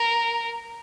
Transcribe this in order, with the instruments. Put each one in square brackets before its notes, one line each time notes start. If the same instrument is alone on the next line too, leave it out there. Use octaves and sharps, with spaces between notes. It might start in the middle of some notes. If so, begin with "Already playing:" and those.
Already playing: [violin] A#4